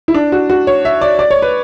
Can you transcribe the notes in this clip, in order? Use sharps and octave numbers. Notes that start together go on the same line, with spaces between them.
E4
D4
F#4
F#4
C#5
E5
D5
D5
C#5
B4